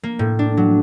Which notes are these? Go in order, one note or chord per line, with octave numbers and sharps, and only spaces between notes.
A#3
A2
D4
F#3